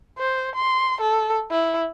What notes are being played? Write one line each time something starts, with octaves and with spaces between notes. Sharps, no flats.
C5
C6
A4
E4